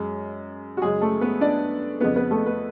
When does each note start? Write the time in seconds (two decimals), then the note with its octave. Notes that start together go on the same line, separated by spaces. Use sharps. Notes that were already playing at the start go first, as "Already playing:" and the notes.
Already playing: F#2 G#3
0.77 F#4
0.82 F#2 C#3 G#3 G#4
1.01 A3 A4
1.21 B3 B4
1.41 D4 D5
2.00 F2 C#3 B3 B4
2.16 B3 B4
2.31 A3 A4
2.46 B3 B4